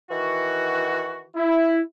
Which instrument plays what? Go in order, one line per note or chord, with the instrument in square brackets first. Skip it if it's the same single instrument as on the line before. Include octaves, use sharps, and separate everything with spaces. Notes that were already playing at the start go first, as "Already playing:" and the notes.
[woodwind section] D#3 E3 F#4
[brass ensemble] E4